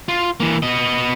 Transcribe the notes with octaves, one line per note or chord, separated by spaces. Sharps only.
F4
E3 A#3
B3 D#5